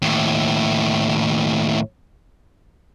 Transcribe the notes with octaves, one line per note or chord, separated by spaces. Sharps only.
D#2 A2